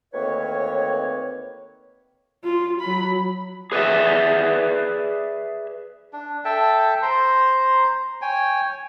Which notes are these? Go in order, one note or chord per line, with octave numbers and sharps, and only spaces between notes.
D2 D#3 A#3 C4 B4 C#5
F4
F#3 B5
G#4 B4 C#5 D5 E5
D4
A4 E5 G5 A5
C5 A#5 C6
C#5 G5 G#5